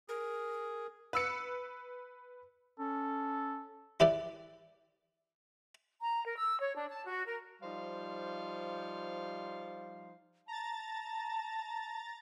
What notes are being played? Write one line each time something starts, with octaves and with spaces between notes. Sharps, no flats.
G#4 A#4
B4 E6 C#7
C#4 A4
E4 G4 B4 D5
A#5
A#4
E6
C#5
D4
A5
F#4
A#4
F3 G3 D#4 C5 F5
A5 A#5 A6